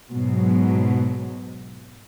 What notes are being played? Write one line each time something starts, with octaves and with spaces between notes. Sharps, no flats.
G#2 B2 F#3